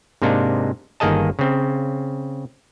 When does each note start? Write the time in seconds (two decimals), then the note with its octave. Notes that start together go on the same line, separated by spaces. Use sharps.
0.22 G#2 C3 A#3 D4 D#4
1.00 G1 D#3 A#3 G#4 D#5 A5
1.39 C#3 C4